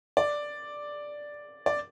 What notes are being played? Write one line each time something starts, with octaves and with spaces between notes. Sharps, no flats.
D5
D5